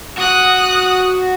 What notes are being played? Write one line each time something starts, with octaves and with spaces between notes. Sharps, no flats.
F#4 D#6 F#6